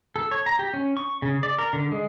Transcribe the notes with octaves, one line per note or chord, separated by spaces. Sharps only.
A4
C#5
A#5
G4
C#4
C#6
C#3
D5
A#4
D3
G#3